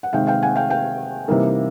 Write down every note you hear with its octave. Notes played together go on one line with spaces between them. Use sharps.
F#5
C3 D#3 G#3 C4 F5 G5
F5 G5
F#5 G#5
F5 G5
F5 G5
C3 E3 G3 A#3 D#4